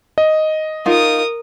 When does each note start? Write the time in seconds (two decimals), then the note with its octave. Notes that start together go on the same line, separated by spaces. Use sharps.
0.18 D#5
0.86 D#4 F4 A#4 D#6